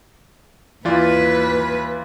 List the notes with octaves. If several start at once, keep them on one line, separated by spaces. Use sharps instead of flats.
D#2 E3 F4 B4 D5